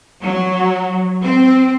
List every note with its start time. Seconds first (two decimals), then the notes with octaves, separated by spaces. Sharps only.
0.22 F#3
1.23 C4